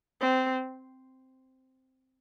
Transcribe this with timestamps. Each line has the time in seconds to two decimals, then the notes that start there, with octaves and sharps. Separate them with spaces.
0.21 C4